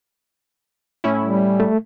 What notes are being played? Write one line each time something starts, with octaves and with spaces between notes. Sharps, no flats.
A2 C#4 E4
G3
A3